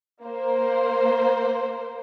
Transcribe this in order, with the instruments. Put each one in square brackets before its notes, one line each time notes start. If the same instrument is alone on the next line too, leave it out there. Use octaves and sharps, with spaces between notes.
[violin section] A#3 C5